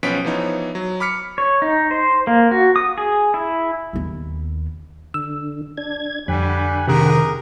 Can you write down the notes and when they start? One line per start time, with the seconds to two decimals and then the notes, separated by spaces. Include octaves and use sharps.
0.03 B1 F3 B3 C#4 B6 D7
0.25 E3 F3 B3 D#4 C#5
0.75 F#3
1.00 B5 D6 F6 B6 C#7
1.38 C#5
1.62 D#4
1.91 C5
2.27 A#3
2.51 F#4
2.76 D#6
2.98 G#4
3.34 E4
3.93 D#2 B3
5.14 D3 E6
5.78 D4 G#6
6.28 F2 D3 G3 F#5 G#5 B5
6.87 C3 D#3 G4 G#4 A#4